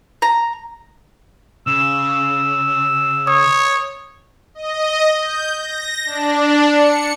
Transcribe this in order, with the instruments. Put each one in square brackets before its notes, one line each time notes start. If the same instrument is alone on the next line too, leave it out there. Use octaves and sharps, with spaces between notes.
[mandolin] A#5
[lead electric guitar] C#3 [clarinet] E6
[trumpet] C#5 [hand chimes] D#6
[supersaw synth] D#5
G6
A#6
D4
C#7